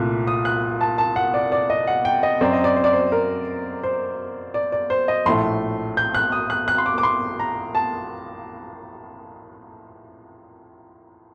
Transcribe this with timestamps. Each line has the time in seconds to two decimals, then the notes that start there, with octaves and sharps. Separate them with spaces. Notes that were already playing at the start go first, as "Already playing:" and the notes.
Already playing: C2 A#2 A3 F#6
0.27 D#6
0.45 F#6
0.81 A5
0.98 A5
1.16 F#5
1.34 D5
1.52 D5
1.70 D#5
1.87 F#5
2.05 G5
2.23 D#5
2.41 F#2 F#3 C4 D5
2.53 D#5
2.64 D5
2.76 C5
2.84 D5
2.93 C5
3.12 A#4
3.83 C5
4.54 D5
4.72 D5
4.90 C5
5.08 D#5
5.26 A#1 A2 A3 C6
5.97 G6
6.15 F#6
6.32 D#6
6.50 F#6
6.68 F#6
6.78 C6
6.86 D6
6.98 D6
7.03 C6
7.39 A#5
7.75 A5